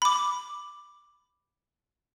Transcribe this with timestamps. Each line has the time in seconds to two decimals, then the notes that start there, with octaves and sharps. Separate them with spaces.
0.02 B5 D6